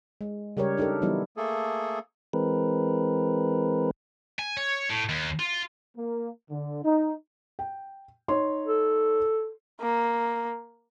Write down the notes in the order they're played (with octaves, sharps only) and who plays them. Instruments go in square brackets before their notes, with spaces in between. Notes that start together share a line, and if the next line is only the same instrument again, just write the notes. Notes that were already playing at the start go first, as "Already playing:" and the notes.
[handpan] G#3
C#3 G3 G4 A#4 C#5
D4 D#4 G4 A4 A#4
E3 F#3 G3 B3 D#4 E4
[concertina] A3 A#3 G#4 A4
[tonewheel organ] E3 G#3 C4 A#4 B4
[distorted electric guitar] G#5
C#5
A2
D#2
F4
[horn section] A#3
D3
D#4
[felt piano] G5
D#4 C#5 C6
[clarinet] A4
[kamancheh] A#3